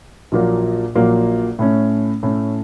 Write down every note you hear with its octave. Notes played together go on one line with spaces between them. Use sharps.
A#1 A#2 F#3 A#3
A#1 A#2 F#3 A#3
A2 A3 C#4
A2 A3 C#4